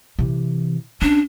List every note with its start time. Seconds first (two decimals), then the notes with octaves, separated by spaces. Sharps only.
0.19 C3 E3
1.02 C#4 D4